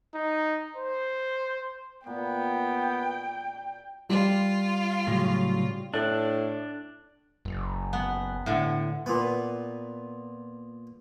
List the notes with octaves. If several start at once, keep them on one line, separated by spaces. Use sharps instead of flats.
D#4
C5
A#2 B3 G5
G3 F4
A2 C#3 F#3
A2 D4
F#1
B3
A2 D3
A#2 B3